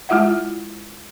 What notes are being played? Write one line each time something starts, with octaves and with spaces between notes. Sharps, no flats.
G#3 E4 F4 E5 F#5